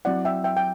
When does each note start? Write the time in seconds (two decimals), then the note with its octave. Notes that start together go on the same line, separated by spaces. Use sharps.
0.05 F#3 C4 E4 D5 F#5
0.25 E5 G5
0.44 E5 G5
0.57 G5